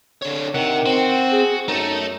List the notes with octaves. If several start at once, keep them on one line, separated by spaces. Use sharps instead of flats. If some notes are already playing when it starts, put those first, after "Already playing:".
D3 C#5
C3 D#3 F#5
C4 F#4
G#4
F#2 A3 D#4 A4